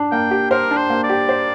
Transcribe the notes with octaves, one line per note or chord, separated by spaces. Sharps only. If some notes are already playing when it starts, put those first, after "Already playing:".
Already playing: D4
A#3 G5
G4
A#4 C5
D4
C5
A#3
D5
G4
C5